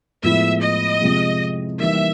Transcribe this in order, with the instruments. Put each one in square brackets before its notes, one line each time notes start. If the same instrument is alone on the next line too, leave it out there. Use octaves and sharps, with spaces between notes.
[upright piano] A2 F3 G#3 B3 E4 [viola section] E5
[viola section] D#5
[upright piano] C3 F3 G#3
[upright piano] E3 G3 A#3 D#4 [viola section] E5